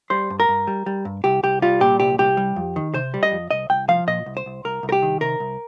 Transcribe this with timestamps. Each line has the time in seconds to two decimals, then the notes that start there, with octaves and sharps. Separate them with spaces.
0.10 G3 C5
0.30 G2
0.40 A#4
0.49 G2
0.67 G3
0.86 G3
1.05 G2
1.24 C2 G4
1.43 C2 G4
1.62 G3 F4
1.80 A#2 G4
2.00 C2 G4
2.19 C2 G4
2.37 G3
2.56 F2
2.76 D#3
2.94 C3 C5
3.14 G3
3.23 D#5
3.32 F2
3.51 C2 D#5
3.70 C2 G5
3.88 F3 F5
4.08 A#2 D#5
4.26 C2
4.37 C5
4.46 C2
4.65 C2 A#4
4.83 C2
4.89 A#4
4.92 G4
5.02 D#3
5.21 C3 A#4
5.40 C2